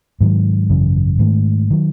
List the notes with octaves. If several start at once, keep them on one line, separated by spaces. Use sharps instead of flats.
G#2 D#3 F#3
G#1 F#2 C#3 E3
G#2 D#3 A3
D#3 F#3